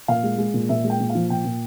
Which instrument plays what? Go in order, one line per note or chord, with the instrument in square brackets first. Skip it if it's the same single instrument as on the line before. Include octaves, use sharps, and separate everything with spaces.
[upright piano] A#2 F5
G#3
G#3
A#2
A#2 E5
G#3
G5
A#2
F5
F3
A#2 G5
A#2